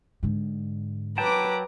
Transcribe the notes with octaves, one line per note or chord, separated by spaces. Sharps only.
G#2 D3
F#3 B4 G5 A5 A#5 D6